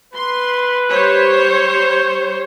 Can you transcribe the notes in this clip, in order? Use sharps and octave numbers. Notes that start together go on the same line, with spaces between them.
B4 C6
G3 C5 C#5